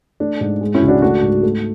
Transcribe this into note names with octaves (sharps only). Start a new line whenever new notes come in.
A3 D4
G#2
G#3
C#4 E4
C#2
D4 F#4
A3 D4 F#4
G#2
A3